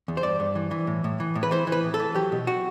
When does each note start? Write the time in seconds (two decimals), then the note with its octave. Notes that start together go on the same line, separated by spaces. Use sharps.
0.08 E2
0.17 C5
0.23 G2 D5
0.40 G2
0.55 E3
0.71 E3
0.87 A2
1.04 A2
1.20 E3
1.35 A2
1.43 B4
1.51 E3 C5
1.67 E3
1.72 B4
1.84 A2
1.94 A4
1.99 E3
2.15 F#3 G4
2.32 B2
2.47 F#4